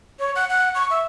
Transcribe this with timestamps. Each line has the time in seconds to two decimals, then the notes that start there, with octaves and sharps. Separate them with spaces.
0.19 C#5
0.35 F#5
0.50 F#5
0.75 C#6
0.90 E5